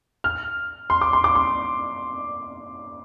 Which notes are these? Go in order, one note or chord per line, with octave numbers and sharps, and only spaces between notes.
F6
C6
D6
C6
D6
C6